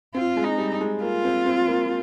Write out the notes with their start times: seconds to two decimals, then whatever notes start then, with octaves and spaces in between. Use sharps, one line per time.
0.14 C4 F4
0.37 G#3
0.44 D#4
0.58 G3
0.81 G#3
1.02 A#3 F4
1.24 C4
1.46 C4
1.68 A#3